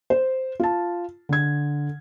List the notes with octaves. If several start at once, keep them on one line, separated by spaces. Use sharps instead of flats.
C5
F4 A5
D3 G#6